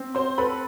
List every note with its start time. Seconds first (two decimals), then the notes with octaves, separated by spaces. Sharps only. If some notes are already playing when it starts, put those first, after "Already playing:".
Already playing: C4
0.15 C5 C6
0.38 A4 B4 B5